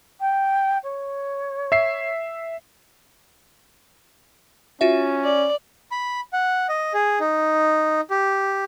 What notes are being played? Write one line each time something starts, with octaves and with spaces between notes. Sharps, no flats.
G5
C#5
E5 C7
C#4 F4 F#4 E5
D5
B5
F#5
D#5
G#4
D#4
G4